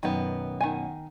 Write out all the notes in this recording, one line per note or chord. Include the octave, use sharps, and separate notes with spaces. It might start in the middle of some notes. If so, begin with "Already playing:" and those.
F#2 B2 D#3 B3
D#3 F#5 G#5